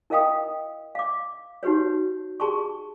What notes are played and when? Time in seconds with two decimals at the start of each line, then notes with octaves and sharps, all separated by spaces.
0.10 E4 A#4 D#5 F5 G5 D#6
0.95 F5 D6
1.63 D#4 F#4 G4 B4 C#5
2.40 G4 G#4 A5 C6 C#6